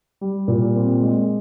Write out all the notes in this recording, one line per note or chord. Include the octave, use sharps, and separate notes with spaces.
G3
A#2
C4
G#3